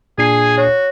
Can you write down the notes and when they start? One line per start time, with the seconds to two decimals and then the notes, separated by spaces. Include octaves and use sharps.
0.18 A#2 D4 G#4 G#5 C7
0.58 F#4 C#5